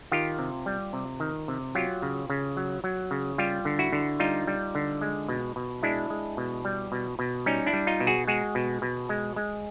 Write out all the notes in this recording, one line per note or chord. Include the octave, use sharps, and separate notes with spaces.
D#3 F4 G4
C3
G3
C3
D#3
C3
F#3 F4 G4
C#3
C#3
F#3
F#3
C#3
G3 F4 G4
D3
E4 F#4
D3
G3 D#4 F4
G3
D3
G#3
B2
B2
G#3 D4 E4
G#3
B2
G3
B2
B2
G3 C#4 D#4
D4 E4
G3
D#4 F4
B2
F#4 G#4
G#3 F#4 G#4
B2
B2
G#3
G#3